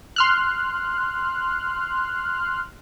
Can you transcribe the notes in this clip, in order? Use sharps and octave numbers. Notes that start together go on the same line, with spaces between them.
C6 F6 F#6